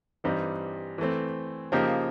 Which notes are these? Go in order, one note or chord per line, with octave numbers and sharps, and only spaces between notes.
G2 E3 G3 C4 D#4
E3 A3 C4
C#3 F3 A#3 D#4 G4